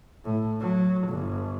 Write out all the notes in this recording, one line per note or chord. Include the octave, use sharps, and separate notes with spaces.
A2
F#3
G1